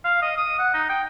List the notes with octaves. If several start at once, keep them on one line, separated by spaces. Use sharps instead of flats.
F5
D#5
D#6
F#5
D#4
G5